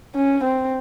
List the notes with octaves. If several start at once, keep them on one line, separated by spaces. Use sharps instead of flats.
C#4
C4